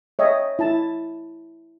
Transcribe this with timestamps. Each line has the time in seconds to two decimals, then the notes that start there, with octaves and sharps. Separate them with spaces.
0.19 C#5 D#5 E5 G5
0.59 E4 A5